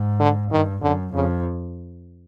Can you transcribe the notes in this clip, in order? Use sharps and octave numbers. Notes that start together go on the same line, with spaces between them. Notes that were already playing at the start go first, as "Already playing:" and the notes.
Already playing: G#2
D3
G2 D#3
F#2 D3
F2 C#3